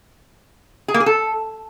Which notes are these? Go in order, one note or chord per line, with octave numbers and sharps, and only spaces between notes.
G#4
A#3
G#4
A4